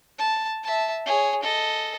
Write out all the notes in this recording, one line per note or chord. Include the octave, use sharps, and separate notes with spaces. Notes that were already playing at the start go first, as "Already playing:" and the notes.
A5
E5 A5
G#4 C#5
A4 D#5